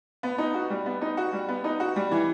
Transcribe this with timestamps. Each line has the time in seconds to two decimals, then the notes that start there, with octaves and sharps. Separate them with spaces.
0.23 B3
0.38 D#4
0.54 F#4
0.70 G3
0.86 B3
1.01 D#4
1.17 F#4
1.33 G3
1.48 B3
1.64 D#4
1.80 F#4
1.96 G3
2.11 E3